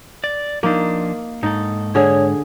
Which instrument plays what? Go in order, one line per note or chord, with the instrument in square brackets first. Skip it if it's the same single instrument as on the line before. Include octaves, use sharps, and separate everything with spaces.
[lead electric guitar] D5
[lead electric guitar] F3 D4 [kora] A#3 D#4
[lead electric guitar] G#2 A4 [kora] D#4
[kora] D3 G#4 [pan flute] C#5